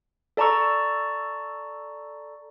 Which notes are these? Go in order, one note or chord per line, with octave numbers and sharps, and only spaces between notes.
A4 D5 A5 A#5 C#6 E6